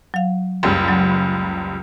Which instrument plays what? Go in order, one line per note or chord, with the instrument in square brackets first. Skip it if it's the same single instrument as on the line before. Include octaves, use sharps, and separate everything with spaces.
[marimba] F#3 F5
[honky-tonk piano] F#1 C#2 G3
[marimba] F#3